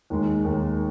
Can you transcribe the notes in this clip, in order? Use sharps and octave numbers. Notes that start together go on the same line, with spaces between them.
D#2 D#3 G#3
D#2 D#3 G#3